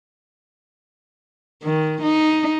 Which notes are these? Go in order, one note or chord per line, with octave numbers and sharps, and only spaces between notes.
D#3
D#4